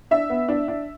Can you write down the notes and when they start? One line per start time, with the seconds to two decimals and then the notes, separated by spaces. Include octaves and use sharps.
0.11 D4 E5
0.30 B3
0.48 D4
0.68 D4